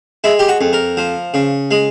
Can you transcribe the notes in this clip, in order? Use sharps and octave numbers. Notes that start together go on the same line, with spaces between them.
G#3 E4
G4
F#4
F2
A#4
F3
C#3
G#3